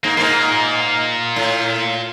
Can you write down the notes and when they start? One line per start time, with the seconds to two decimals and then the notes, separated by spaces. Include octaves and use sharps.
0.04 G#2 A#3
0.17 G#2 A#3 F4 A#4
1.36 A2